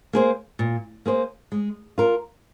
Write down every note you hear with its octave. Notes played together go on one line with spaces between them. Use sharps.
A#3 G#4 C5
A#2
A#3 G#4 C5
G#3
F4 A#4